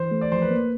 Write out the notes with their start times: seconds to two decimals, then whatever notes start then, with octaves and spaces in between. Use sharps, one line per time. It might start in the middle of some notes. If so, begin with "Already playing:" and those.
Already playing: E3 C5
0.11 A3
0.21 D5
0.32 F3 C5
0.42 B4
0.51 A#3